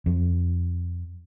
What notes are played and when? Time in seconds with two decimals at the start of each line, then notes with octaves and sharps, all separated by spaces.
0.06 F2